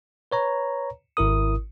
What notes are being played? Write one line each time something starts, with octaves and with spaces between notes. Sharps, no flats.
B4 C#5 A#5
G#1 E4 A#4 D#6